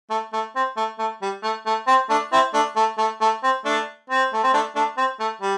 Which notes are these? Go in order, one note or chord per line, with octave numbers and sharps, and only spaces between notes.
A3
A3
C4
A3
A3
G3
A3
A3
C4
A3 D4
C4 E4
A3 D4
A3
A3
A3
C4
A3 D4
C4
A3
C4
A3 D4
A3 D4
C4
A3
G3